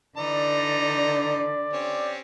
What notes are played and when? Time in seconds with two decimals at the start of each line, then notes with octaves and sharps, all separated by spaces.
0.17 D3 E3 D#4 D5 A#5
1.73 C4 C#4 G4